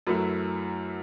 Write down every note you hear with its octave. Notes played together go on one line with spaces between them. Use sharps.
F#2 F#3 A3 E4 B4